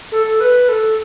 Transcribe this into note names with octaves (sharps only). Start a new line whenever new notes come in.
A4
B4
A4